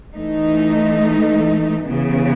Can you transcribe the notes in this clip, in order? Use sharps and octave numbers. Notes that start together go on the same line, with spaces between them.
E3 A3 D#4
C#3 E3 B3